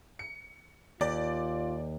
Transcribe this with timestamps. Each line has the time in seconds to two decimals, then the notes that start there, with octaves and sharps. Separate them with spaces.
0.19 C#7
1.01 D#2 F4 D5